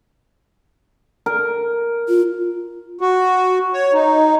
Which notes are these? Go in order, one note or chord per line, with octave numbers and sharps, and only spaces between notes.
A#4
F4
F#4
C#5
D#4